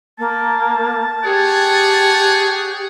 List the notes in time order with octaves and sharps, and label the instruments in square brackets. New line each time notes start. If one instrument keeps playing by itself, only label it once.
[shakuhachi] A#3 [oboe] A5
[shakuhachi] G4 [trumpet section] G#4 C#5 F#5